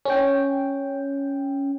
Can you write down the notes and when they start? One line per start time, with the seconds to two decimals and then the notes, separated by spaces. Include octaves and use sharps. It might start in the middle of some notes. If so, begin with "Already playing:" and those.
0.05 C#4 G5